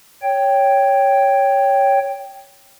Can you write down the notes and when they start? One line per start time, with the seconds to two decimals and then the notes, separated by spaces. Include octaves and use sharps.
0.23 C#5 G5